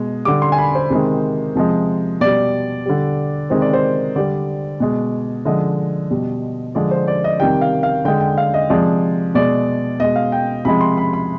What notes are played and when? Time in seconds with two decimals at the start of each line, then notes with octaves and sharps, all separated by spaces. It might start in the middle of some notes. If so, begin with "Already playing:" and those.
Already playing: B2 G#3
0.25 D3 G3 D6
0.42 C6
0.52 G#5
0.58 B5
0.75 C5
0.90 C3 D#3 G#3
1.55 C3 F3 G#3
2.20 B2 G3 D5
2.86 D3 G3
3.50 C3 D#3 G#3 C5
3.62 D5
3.73 C5
4.16 D3 G3 D5
4.80 B2 G#3
5.45 D3 F3 G#3 D#5
6.11 B2 G3
6.75 D3 F3 G#3 D5
6.91 C5
7.08 D5
7.24 D#5
7.40 C3 D#3 G3 G5
7.61 F5
7.83 F5
8.05 D3 G#3 G5
8.21 G5
8.38 F5
8.54 D#5
8.70 C3 F3 G#3 D5
9.35 B2 G#3 D5
10.00 B2 G#3 D#5
10.16 F5
10.32 G5
10.65 C3 F3 G#3 B5
10.81 C6
10.98 B5
11.13 B5